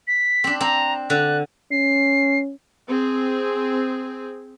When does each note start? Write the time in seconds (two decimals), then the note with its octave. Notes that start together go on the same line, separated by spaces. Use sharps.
0.07 B6
0.44 C4 D4
0.61 C4 A#5
1.10 D3 F#6
1.71 C#4 C7
2.88 C4 G#4